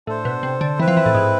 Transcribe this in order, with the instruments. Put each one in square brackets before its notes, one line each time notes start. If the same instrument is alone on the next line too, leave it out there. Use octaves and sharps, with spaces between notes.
[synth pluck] A2 [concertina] D4 A4 C5
[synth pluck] B2
C3
D3
[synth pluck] E3 [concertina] C4 E4 B4
[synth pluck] F3
E3
A2
G#2